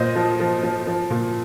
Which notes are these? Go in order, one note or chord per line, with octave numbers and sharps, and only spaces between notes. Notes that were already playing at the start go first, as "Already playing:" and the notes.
Already playing: A#2 C5 D#5
F3
F3
F3
F3
A#2